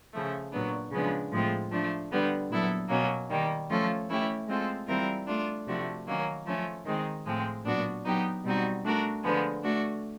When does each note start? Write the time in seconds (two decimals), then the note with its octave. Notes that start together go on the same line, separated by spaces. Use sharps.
0.13 C#3 F3 A3
0.52 A#2 F#3 B3 D4
0.92 C#3 F3 G#3 B3 D4
1.32 A2 F3 G#3 C4 F4
1.71 F3 A3 D4
2.11 D3 G3 B3 D4
2.50 A#2 F#3 B3 E4 A4
2.90 B2 F#3 A#3 C#4
3.30 D#3 G3 A#3
3.69 F3 A3 C#4 F4 A4
4.09 E3 A3 C#4 E4 G4
4.48 G#3 C4 F4 A4
4.88 E3 G3 C4 F4 A#4
5.27 A3 D4 F4
5.67 C3 F3 A3 D4 F#4
6.07 D#3 F#3 A#3 C#4
6.46 F3 A3 C#4
6.85 D#3 G#3 C4 D#4
7.26 A2 F3 G#3 C4
7.65 A#2 F#3 B3 D4 F#4
8.05 F#3 B3 D#4 G4
8.44 B2 G3 C4 D#4 F#4
8.84 A3 D4 F#4 A#4
9.24 D3 F3 G#3 B3
9.63 A3 D4 F#4